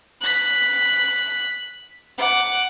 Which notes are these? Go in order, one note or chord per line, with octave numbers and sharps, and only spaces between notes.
F#6 B6
F#5 D6